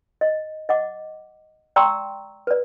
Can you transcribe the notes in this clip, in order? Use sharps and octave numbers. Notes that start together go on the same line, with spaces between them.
D#5
D#5 F#5 D6
D5 G5 A#5 C6 C#6 E6
B4 D5